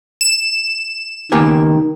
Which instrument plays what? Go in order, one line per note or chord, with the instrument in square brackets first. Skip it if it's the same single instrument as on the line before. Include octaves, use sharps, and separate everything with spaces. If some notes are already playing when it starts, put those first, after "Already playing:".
[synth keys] E7
[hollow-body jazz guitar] C#2 A#3 G#5 [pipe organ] D#3 [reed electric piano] B3 G4 A#4